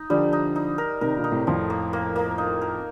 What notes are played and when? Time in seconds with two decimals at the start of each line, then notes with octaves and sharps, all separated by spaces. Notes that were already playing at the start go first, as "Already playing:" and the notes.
Already playing: D#4
0.10 D3 F3 G3
0.33 D#4
0.56 D#4
0.78 A#4
1.01 C3 D#3 A#4
1.17 A#2 D3
1.24 D#4
1.32 A2 C3
1.47 F2 A2 F3
1.70 A#3
1.93 A#3
2.16 A#3
2.38 D#4
2.62 A#4